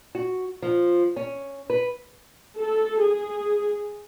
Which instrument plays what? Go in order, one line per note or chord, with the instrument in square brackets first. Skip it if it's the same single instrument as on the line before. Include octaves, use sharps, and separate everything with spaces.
[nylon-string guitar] F#4
F3
C#4
B4
[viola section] A4
G#4